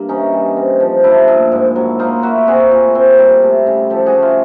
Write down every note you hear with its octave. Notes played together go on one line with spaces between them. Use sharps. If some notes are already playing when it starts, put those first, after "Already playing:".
Already playing: G2 A#3
E3 C#4 D#4
G3
C4
F3
A#2 D4 E4
A#2
G#2
F#3
A#3 D#4 F4
A#3 E4 F#4
C4 F#4 G#4
A#2
C4
G3
A3
C#3
F3 G4 A4
F#4 G#4
A3
F4 G4